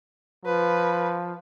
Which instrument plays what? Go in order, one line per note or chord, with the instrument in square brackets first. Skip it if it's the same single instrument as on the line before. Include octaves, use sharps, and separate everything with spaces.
[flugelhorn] F3 [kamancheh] B4